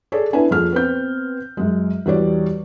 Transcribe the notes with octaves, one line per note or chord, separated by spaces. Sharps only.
G#4 A4 C#5 D5
B3 C#4 D4 E4 B4 G#5
F2 A#2 G#4 A4 F6
B3 C4 G6
F#2 G#3
E2 G3 F#4 C#5 D5